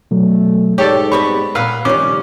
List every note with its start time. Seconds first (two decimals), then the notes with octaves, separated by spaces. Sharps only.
0.11 B2 F#3 A3
0.78 G#2 G4 A4 C#5 D5
1.12 G3 B3 C4 B5 C#6
1.55 A#2 B3 B4 F5
1.85 F1 D#3 G3 C#4 D6